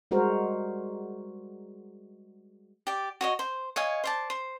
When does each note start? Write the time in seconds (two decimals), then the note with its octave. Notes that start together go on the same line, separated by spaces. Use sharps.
0.11 G3 G#3 F#4 A#4 C5
2.87 G4 D5
3.21 F#4 C#5 D#5
3.39 C5
3.76 C#5 D#5 F5 G#5
4.04 C5 D5 A5
4.30 C5